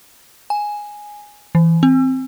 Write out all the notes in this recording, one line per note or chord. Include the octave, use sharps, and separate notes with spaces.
G#5
E3
C4